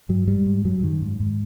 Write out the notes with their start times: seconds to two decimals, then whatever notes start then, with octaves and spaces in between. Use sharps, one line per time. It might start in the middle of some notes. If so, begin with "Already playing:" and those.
0.09 G2 F#3
0.27 G#2 G3
0.46 G#2
0.65 F#2 F#3
0.82 F#2 D#3
1.02 G#2
1.20 G#2